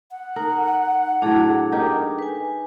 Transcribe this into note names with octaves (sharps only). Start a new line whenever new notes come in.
F#5
D#4 A#4
A2 F#3 D4 G#4 A4
D#4 G4 A#4
B4 G#5